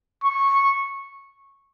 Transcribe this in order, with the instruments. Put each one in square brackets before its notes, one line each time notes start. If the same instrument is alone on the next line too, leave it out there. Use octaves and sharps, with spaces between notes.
[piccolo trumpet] C#6